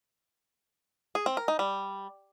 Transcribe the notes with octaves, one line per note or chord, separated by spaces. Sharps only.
G#4
C4
A#4
D#4
G3